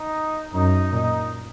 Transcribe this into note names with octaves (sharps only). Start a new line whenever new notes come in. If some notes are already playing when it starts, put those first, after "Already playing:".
Already playing: D#4
F#2 D#4
A#2 D#4